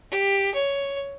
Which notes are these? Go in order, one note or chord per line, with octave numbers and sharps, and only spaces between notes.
G4
C#5